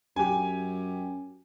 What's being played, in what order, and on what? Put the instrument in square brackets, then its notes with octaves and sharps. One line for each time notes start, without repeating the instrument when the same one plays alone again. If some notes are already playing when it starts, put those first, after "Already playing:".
[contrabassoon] F#2 [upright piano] G4 G#5